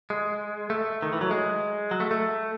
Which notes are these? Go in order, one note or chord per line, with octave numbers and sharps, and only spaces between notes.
G#3
A3
D#3
E3
F#3
G#3
F#3
A3
A3